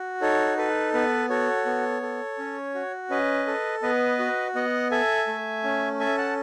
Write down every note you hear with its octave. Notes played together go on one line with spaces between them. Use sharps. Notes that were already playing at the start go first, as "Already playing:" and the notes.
Already playing: F#4
D#4 A4 C#5
A4 B4
B3 B4
F#4 A4 C#5
B3
A4
C#4
F#4
C#4 B4 D#5
A4
B3 B4 D#5
F#4
B3 D#5 F#5
A4 E5 G#5
A3
C#4
A4 E5 G#5
F#5 A5